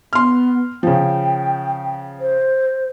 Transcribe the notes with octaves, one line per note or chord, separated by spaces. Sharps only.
B3 C6 F6
C#3 F3 G5
C5